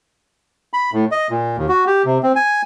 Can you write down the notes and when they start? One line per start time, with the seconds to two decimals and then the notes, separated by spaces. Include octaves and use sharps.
0.74 B5
0.93 A2
1.11 D#5
1.30 A#2
1.57 D#2
1.69 F#4
1.87 G4
2.05 C3
2.23 C4
2.36 G#5